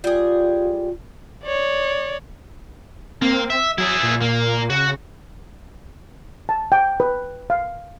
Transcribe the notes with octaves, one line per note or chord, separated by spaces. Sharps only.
G3 F4 G#4
C#5 D5
A#3 C4
E5
F#3 E4 G#4
A#2
A#2 A#3
C#3 F#4
A5
G5
B4
F5